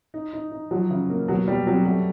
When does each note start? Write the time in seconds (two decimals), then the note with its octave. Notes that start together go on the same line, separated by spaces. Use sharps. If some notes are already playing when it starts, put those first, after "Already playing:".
0.14 D#4
0.33 D#4
0.51 D#4
0.71 F3 F#3
0.91 C#3
1.10 A#3
1.28 B2 F#3
1.47 B2 G3
1.67 F#3 C4
1.85 F#3 A3